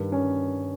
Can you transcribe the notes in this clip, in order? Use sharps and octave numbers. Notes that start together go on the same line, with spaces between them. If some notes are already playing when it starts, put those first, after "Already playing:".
Already playing: G2 D#3
C#4